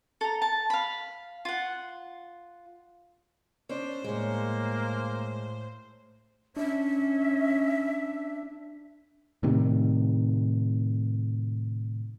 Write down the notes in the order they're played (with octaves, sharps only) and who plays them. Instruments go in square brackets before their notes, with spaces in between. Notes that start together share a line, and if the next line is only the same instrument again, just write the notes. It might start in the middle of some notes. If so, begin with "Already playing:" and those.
[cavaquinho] A4 A#5
A5
F5 B5
F4 F#5
[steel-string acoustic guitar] C#4 D4 [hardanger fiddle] C5
[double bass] A2 [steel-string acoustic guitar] G#3 C#5 [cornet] A#3
[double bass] C#4 [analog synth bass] D4 [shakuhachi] E5
[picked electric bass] A2 C3 D#3